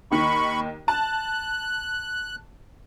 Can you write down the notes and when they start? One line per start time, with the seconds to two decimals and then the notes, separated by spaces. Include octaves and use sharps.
0.11 D#2 D#3 B5 C#6
0.88 A5 F#6